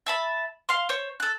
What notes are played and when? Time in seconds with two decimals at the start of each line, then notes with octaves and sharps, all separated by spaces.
0.06 E5 A5 B5
0.69 F5 C6
0.89 C5 C#5
1.20 A4 F#6